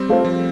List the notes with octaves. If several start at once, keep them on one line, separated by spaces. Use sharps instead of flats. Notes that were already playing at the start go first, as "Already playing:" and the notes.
Already playing: G3 C4
A3 F4 C5
F3